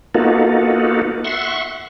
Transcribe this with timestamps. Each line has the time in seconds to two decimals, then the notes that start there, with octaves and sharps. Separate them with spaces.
0.15 A#3 B3 D#4 F4 F#4 A4
1.24 E5 F#5 C6 C#6